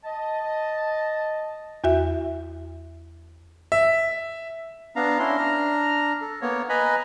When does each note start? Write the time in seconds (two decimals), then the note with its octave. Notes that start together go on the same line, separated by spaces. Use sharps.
0.04 D#5 A5
1.84 E2 F#4 E5
3.72 E5
4.96 B3 D4 F5 A#5
5.19 C#4 D4 E4 C6
5.37 D4 A#5 F6
6.21 A4
6.41 A#3 B3 C#5
6.69 B4 D#5 G#5 A#5 B5